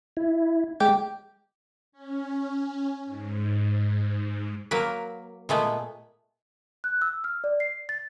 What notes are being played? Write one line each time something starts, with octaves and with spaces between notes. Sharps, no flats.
E4
G#3 G4
C#4
G#2
F#3 A#3 A#4 B4
A#2 G#3 A3 B3
F#6
E6
F6
D5
C7
A6